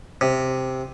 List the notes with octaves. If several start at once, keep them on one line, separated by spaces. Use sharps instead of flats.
C3